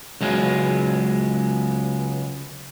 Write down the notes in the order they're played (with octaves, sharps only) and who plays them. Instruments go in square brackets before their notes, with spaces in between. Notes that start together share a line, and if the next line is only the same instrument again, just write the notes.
[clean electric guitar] C#2 F#3 G#3 B3